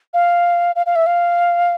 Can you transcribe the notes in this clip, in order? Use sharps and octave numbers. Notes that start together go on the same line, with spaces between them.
F5
F5
F5
E5
F5